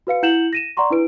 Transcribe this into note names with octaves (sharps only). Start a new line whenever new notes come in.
F#4 B4 F5 C#7
E4 F#5 G6 C#7 E7 F#7
A#6 D#7 E7
D5 F#5 A#5 C6 C#6
D4 E4 B4 D7